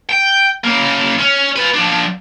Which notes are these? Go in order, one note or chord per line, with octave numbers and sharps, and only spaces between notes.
G5
C#3 A#3
C#4
F4 B4
F3 D4